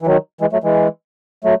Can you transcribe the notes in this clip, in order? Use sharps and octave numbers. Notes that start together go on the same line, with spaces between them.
E3
D#3 F#3
E3 G#3
F#3 A3
E3 G#3
F#3 A3